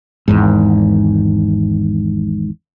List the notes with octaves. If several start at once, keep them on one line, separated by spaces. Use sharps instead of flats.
G#1 E2 G#2